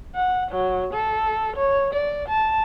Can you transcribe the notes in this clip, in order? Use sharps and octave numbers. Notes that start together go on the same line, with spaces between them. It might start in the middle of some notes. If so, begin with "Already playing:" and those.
F#5
F#3
A4
C#5
D5
A5